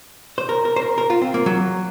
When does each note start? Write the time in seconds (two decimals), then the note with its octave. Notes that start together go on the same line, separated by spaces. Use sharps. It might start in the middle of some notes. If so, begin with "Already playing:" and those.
0.38 C5
0.49 A#4
0.65 A#4
0.76 C5
0.82 A#4
0.98 A#4
1.10 F4
1.22 C4
1.34 A#3
1.46 F#3